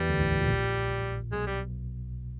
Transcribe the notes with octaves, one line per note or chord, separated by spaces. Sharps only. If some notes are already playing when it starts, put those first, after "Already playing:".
Already playing: E2 E3 G3
D2 D3
A1 A2
A#1 A#2
B1 B2 G#3
G3